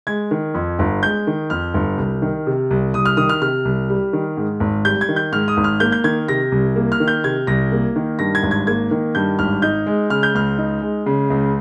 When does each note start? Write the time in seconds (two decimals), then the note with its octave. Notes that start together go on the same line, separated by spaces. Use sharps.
0.07 G#3 G#6
0.31 D#3
0.54 F2
0.79 G1
1.03 G#3 G6
1.27 D#3
1.50 F2 F6
1.74 G1
1.98 C2
2.22 D#3
2.47 C3
2.70 C2
2.94 C2 D#6
3.06 F6
3.17 D#3 D#6
3.29 F6
3.41 C3 F6
3.65 C2
3.90 G3
4.13 D#3
4.37 G#2
4.60 G#1
4.85 G3 G6
5.01 G#6
5.09 D#3
5.16 G6
5.32 G#2 F6
5.48 D#6
5.57 G#1
5.64 F6
5.80 A#3 G6
5.92 G6
6.04 D#3 G#6
6.28 C3 A#6
6.52 C2
6.76 A#3
6.92 F6
7.00 D#3
7.08 G6
7.24 C3 G#6
7.47 C2 A#6
7.72 A#3
7.96 D#3
8.19 G2 A#6
8.35 G#6
8.43 G#1
8.51 G#6
8.67 A#3 G#6
8.91 D#3
9.15 G2 G6
9.39 G#1 F6
9.62 D#4 G6
9.87 G#3
10.10 C#3 F6
10.23 G6
10.34 C#2 F6
10.58 D#4
10.82 G#3
11.06 C#3
11.30 C#2